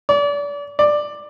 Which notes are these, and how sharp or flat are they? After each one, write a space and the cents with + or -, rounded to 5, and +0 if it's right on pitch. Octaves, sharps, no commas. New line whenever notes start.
D5 -35
D5 +10